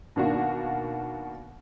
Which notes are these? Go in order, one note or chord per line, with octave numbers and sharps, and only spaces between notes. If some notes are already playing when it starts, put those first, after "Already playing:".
B2 D#3 A#3 D4 F#4